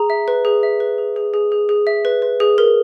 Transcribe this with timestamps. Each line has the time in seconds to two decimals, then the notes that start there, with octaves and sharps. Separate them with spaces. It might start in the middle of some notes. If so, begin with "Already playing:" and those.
Already playing: G#4 A#5
0.10 E5
0.28 B4
0.45 G#4
0.63 E5
0.80 B4
0.98 G#4
1.16 G#4
1.34 G#4
1.52 G#4
1.69 G#4
1.87 E5
2.05 B4
2.22 B4
2.40 G#4
2.58 A#4